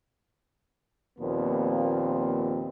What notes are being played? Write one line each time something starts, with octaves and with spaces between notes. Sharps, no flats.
D#2 A#2 F3 B3 C4